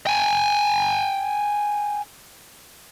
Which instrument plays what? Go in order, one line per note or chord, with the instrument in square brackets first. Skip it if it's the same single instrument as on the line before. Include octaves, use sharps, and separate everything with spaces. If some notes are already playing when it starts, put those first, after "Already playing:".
[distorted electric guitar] G5 G#5